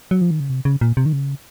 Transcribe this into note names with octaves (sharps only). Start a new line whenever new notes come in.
F#3
F3
D#3
C#3
C3
C#3
A#2
C3
D#3
C#3